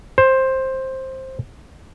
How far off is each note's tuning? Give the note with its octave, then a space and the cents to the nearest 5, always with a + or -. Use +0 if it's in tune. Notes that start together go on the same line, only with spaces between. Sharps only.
C5 +10